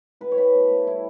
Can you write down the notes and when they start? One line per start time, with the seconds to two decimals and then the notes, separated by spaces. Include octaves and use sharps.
0.21 A2 B4
0.32 C#5
0.37 A3 B4
0.54 B2
0.70 A3
0.87 G3 E4